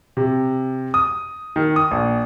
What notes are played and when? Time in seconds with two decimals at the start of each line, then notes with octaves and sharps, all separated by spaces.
0.17 C3
0.94 D#6
1.56 D#3
1.76 D#6
1.91 A#1